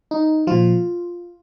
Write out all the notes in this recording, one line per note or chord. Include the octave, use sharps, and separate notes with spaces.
D#4
A#2 F3 F4